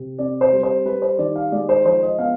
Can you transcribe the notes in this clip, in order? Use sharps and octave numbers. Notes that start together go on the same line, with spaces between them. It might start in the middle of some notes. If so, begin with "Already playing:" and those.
Already playing: C3
C4 D5
C5
G3
C5
G3 B4
C5
D#3 D5
F5
G#3 D5
C5
F3 C5
D#5
B3 F5